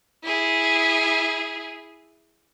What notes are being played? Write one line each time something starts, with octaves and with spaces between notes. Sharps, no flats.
E4 G#4